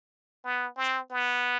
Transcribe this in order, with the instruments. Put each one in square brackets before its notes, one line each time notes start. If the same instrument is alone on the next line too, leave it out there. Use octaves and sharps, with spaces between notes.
[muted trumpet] B3
C4
B3